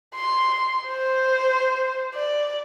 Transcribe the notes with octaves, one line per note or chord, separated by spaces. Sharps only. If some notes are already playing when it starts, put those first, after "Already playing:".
C6
C5
D5